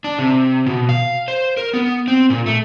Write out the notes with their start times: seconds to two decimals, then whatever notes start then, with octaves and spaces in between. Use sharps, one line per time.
0.04 D4
0.19 C3
0.66 B2
0.89 F5
1.28 C5
1.57 A#4
1.74 B3
2.08 C4
2.30 A#2
2.46 A3